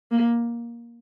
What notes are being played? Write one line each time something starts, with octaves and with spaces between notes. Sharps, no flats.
A#3